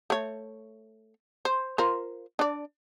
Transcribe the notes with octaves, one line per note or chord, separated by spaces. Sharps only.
A3 C#5
C5
F4 A#4 C5
D4 D5